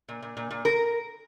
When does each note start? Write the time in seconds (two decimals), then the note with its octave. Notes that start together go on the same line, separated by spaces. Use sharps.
0.09 A#2
0.22 A#2
0.37 A#2
0.51 A#2
0.65 A#4